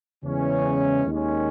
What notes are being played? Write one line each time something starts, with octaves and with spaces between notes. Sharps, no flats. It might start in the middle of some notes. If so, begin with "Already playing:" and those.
E2 C#3 E3 G#3 C#4
D#2 D#3 G#3 C#4